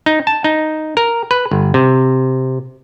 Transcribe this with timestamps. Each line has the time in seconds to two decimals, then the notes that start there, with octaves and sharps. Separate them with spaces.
0.06 D#4
0.27 A5
0.44 D#4
0.97 A#4
1.31 B4
1.51 G1
1.74 C3